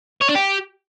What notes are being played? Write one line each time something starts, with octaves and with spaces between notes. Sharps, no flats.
C#5
D4
G4